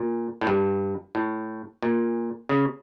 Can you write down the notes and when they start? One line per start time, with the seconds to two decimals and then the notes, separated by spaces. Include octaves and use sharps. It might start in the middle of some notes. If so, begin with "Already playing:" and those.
Already playing: A#2
0.41 A2
0.47 G2
1.15 A2
1.82 A#2
2.49 C#3